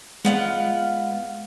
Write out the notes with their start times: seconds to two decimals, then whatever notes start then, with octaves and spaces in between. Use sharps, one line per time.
0.25 G#3 B3 F4 F#5